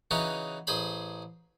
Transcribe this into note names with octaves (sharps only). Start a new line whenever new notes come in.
C#3 E3 C#4 D#4 F#4
A1 G#4 C5 B5